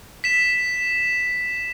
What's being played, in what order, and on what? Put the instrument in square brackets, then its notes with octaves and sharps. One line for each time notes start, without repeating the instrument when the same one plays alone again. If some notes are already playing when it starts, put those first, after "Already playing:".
[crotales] B6 E7